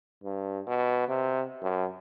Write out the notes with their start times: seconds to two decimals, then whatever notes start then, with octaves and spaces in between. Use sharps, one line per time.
0.24 G2
0.67 B2
1.09 C3
1.62 F#2